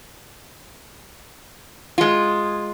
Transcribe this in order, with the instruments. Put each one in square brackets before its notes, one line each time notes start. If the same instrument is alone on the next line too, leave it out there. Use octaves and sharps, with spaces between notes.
[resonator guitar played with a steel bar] G#3 F4